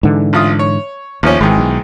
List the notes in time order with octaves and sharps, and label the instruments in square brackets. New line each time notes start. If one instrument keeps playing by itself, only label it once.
[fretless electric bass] G#2 D3 E3
[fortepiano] A1 F4 D#6
C#5
[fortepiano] A1 F3 C#4 [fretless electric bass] D#2
[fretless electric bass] G#1 [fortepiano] G#2 D#3 E3
[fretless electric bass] B1